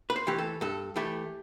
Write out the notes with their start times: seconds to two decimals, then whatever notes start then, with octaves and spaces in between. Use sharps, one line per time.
0.10 B4
0.16 C5
0.27 E3 A3 G4
0.38 A4
0.61 G2 A4
0.96 E3 A3 G4